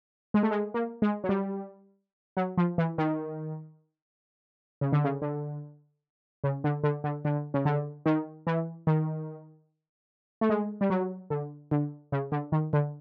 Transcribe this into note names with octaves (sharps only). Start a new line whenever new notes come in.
G#3
A3
G#3
A#3
G#3
F#3
G3
F#3
F3
E3
D#3
C#3
D3
C#3
D3
C#3
D3
D3
D3
D3
C#3
D3
D#3
E3
D#3
A3
G#3
G3
F#3
D3
D3
C#3
D3
D#3
D3